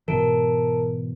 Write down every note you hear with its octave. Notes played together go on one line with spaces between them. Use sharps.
G#2 B2 E3 A#4 A5 D7